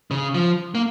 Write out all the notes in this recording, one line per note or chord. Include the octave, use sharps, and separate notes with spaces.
C#3
F3
A#3